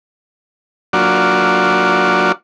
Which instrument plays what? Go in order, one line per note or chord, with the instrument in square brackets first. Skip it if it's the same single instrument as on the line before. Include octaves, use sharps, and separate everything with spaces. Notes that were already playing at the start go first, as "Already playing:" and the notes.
[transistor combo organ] F#3 A#3 D4 F4 F#4 D5